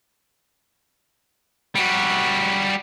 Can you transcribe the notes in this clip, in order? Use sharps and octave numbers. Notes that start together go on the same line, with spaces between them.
G3 F#4